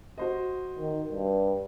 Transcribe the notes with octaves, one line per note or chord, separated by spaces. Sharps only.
F#4 C5 D#5
D#3
G2